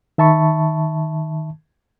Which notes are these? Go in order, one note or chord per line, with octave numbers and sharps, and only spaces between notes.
D#3 E5 A5 B5 C#6